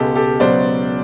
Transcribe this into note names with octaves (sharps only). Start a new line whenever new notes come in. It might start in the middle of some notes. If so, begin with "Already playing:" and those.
Already playing: C#2 B2 G#3 G4 A4
G4 A4
C#2 B2 F#3 C5 D5